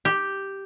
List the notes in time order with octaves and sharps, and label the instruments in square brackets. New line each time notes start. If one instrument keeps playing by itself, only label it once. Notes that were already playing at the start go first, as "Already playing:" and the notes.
[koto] G4